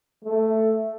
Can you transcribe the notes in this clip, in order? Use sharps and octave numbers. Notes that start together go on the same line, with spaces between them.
A3